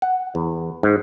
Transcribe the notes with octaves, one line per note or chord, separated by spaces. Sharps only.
F#5
E2
G#2